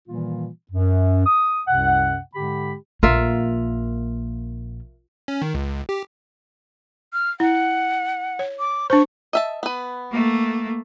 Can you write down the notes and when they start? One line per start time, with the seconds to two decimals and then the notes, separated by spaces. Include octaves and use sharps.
0.08 A#2 D#3 E3 G3 A#3 F4
0.71 F#2
1.26 D#6
1.67 C2 F#2 C3 F#5
2.35 G#2 D3 G#3 G4 B5
3.03 A#1 A#3 F4 A#4 E5
5.28 C#4
5.42 D#3
5.54 C#2
5.89 G4
7.13 F6
7.40 E4 F#5
8.39 C#5
8.59 D6
8.90 D4 C5 C#6
9.33 D#5 E5 A5
9.63 B3 B4
10.12 A3 A#3